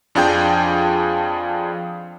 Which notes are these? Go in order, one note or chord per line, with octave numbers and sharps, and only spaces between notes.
F2 D4 F4 G#4 G5 G6